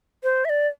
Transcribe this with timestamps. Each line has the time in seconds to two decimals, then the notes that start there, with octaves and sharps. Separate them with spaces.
0.23 C5
0.45 E5
0.49 D5